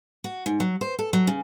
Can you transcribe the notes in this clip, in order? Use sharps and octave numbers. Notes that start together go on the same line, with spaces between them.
F#4
G#2
F#3
C5
A4
F#3
C#3